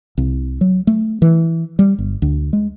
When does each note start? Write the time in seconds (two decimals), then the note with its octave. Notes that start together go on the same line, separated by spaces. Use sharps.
0.18 C2
0.61 F#3
0.87 A3
1.22 E3
1.79 G3
1.99 G1
2.22 D2
2.53 G#3